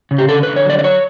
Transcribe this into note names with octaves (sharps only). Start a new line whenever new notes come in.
C#3
G4
D3 A4
D3 B4
C#5
F#3 D5
D5
F#3 C#5